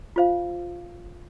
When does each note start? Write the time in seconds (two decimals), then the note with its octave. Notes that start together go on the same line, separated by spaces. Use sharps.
0.16 F4 C5 F5